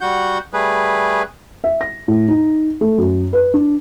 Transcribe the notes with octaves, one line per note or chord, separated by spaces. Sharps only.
G3 F#4 F#5 G6
G3 A3 G#4 B4
E5
A#6
A2
D#4
A3
F#2
B4
D4